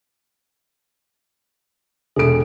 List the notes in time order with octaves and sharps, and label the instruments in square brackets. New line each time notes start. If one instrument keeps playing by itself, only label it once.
[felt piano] E1 A4 D7 [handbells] G#4